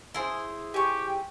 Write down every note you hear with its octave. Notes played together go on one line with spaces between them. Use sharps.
E4 G#4 C5
G4 G5 G#5 C#6